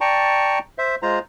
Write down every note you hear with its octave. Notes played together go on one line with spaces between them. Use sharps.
D5 G5 A5 A#5 C#6
C5 E5
G#3 F4 C5 A#5